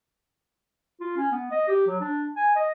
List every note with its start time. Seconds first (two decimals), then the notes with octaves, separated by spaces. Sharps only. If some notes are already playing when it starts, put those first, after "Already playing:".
1.00 F4
1.17 C#4
1.32 B3
1.51 D#5
1.68 G4
1.87 F#3
2.01 D4
2.37 G#5
2.56 D#5